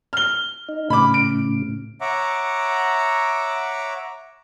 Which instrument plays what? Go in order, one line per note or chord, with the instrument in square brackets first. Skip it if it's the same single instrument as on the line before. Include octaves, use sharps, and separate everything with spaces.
[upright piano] F6 G7
[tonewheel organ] D#4
[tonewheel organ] A2 C#3 [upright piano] B5 D6
[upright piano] D7
[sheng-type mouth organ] C#5 E5 F#5 A#5 D6